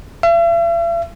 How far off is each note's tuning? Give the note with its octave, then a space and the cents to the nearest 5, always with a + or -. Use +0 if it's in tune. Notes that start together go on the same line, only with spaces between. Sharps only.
E5 +45